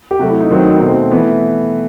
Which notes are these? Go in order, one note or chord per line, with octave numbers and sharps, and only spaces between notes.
G4
C3 F#3 A3 F#4
E4
D#4
D#3 F#3 A3 C4
D#4
C4
B2 A3 D#4
C4
E3 A3 B3